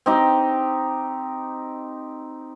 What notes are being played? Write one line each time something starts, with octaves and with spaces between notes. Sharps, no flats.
C4 D#4 G4